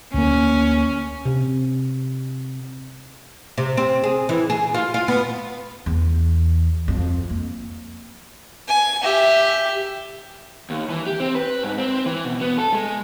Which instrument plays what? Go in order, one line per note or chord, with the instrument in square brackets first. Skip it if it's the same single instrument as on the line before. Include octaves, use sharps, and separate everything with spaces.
[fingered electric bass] D2 A#3 [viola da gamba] C#4
[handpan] C3
[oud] C3
C4
G#4
E3
G#4
F4
F4
B3
[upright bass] E2
F2
A#3
[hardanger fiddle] G#5
G4 E5
[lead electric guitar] D#2
E3
G4
C4
B4
G#2
C4
E3
B2
B3
A4
G#3